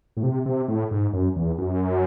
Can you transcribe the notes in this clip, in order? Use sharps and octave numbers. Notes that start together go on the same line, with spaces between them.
A2
C3
C3
A2
G#2
F#2
E2
F#2